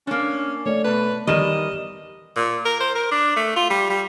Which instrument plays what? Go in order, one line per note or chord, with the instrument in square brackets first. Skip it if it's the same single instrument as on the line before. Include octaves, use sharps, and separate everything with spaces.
[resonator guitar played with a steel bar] A#3 D4 [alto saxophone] C#4
[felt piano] A3 D5 [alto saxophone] C#5
[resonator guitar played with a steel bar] B2 A5 [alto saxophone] B4
[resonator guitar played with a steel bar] E2 D#3 A#4 [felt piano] G3 D5 E7 [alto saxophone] D#5
[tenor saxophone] A#2
A#4
C5
A#4
D4
A3
F4
G3
G3